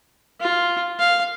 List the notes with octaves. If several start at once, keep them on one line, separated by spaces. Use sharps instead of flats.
F4
F5